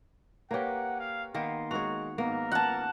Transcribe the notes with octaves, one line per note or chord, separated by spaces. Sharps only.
A#3 G4 A#4 B4 C#5 F#5
F5
D#3 A#3 B3 C6
G#3 F#4 A#4 C#5 F7
G#2 A#3 B3 A#4
F#5 A5